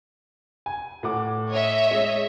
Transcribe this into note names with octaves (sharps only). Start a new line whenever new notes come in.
G#5
A2 F#5 D6
C#5 D#5 E5
G#3